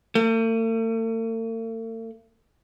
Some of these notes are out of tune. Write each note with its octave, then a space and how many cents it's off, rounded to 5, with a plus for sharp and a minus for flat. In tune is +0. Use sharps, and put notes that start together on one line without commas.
A3 +45